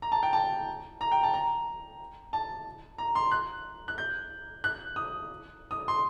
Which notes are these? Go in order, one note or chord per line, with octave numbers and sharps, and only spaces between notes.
A#5
A5
G5
A5
A#5
G5
A5
A#5
A5
A#5
C6
F#6
F#6
G6
F#6
D#6
D#6
C6